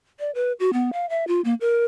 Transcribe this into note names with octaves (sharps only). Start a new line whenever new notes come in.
D5
B4
F#4
B3
F5
E5
F4
A#3
A#4